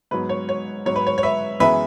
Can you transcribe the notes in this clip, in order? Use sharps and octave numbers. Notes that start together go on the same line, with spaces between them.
G#2 F#3 B3 B4
C#5
C#5
G#2 F#3 B3 C#5
B4
C#5
C#5
B4 E5
F#2 E3 G#3 B3 B4 E5